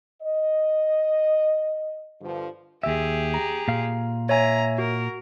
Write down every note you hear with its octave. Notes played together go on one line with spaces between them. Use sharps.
D#5
G2 D3 F3
D#2 G4 G#4 E5
A#5
A#2 F5
C#5 E5 G#5 A#5
F#4 A#4